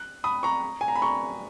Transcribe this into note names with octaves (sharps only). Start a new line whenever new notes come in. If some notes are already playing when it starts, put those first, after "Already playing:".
Already playing: F#6
B5 D#6
A#5 C#6
G#5
A#5
B5
A#5 C#6